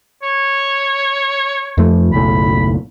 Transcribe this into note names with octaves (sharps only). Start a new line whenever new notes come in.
C#5
F2 F3 A3
F#1 B1 A2 B5